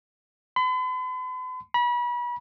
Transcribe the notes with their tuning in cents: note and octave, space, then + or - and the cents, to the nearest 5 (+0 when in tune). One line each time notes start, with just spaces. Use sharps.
B5 +45
B5 -35